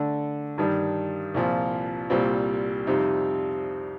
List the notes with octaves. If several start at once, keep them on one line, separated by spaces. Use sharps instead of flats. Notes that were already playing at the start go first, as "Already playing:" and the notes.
Already playing: D3 A3 D4
G2 D#3 G3 D4
C2 A#2 F3
C2 A#2 G3 C4
F2 C3 G3 C4 D#4